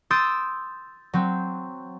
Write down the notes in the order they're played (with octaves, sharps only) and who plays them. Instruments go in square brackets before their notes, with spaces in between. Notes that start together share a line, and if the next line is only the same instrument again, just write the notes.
[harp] C6 D#6 E6 G6 A6 D7
F#3 C4